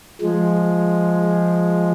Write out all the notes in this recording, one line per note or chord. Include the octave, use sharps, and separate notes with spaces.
F3 G#3